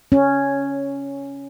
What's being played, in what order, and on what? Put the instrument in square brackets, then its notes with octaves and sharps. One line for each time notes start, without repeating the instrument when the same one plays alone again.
[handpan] C#4